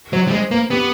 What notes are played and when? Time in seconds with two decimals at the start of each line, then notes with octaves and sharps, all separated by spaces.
0.13 F#3 C5
0.28 G3
0.32 G#3 C5
0.51 A#3 B4
0.70 B3 G4